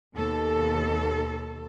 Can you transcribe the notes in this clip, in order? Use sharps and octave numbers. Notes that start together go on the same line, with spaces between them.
D#2 B2 A4